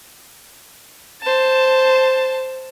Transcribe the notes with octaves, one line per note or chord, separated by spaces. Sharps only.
C5 A5